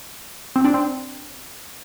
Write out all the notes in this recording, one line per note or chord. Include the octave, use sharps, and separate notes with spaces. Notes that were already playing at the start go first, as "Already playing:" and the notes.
C4
D4
C4